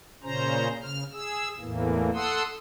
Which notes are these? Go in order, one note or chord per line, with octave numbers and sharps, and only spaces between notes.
A#2 C#3 C#4 C5 A#5
C#3 F6
G#4 E6
E2 A2 E3 A#3
A4 F#5 C6 D#6 E6